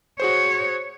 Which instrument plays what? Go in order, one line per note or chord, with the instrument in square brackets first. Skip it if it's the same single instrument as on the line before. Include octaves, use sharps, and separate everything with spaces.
[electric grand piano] F#4 G#4 C5 [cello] C#5